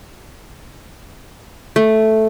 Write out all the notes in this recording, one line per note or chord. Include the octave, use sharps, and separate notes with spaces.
A3